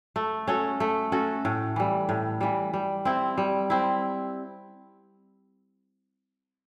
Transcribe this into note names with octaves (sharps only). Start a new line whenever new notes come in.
A3
C#4 F#4 A4
A3
C#4 F#4 A4
A2
E3 G3
A2
E3 G3
G3
C4 E4
G3
C4 E4